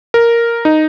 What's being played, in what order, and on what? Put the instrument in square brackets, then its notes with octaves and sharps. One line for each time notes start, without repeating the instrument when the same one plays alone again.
[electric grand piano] A#4
D#4